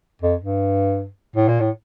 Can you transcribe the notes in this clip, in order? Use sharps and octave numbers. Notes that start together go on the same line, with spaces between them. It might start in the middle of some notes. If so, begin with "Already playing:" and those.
F2
G2
A2
A#2
A2